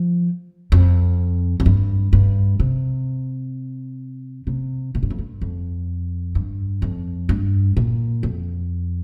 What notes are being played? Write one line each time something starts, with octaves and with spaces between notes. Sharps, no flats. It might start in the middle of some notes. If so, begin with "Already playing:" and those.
Already playing: F3
F2
F2
G2
G2
C3
C3
A#2
G2
F2
G2
F2
G2
F2
G2
A#2
F2